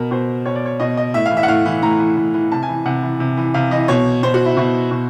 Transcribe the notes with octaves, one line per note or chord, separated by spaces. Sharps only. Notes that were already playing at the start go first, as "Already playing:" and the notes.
Already playing: B2 A#4
B2 C5
B2 C#5
D5
C#5
B2 D#5
D#5
A2 E5
F5
E3
E5
F#5
A2 F5
E3
A2 A#5
E3
A2
E3
C3 A5
G#5
E3
C3 F#5
E3
C3
E3
C3 F5
E3 D#5
B2 C#5
B2 C5
F#4
E4
B2 E4
B2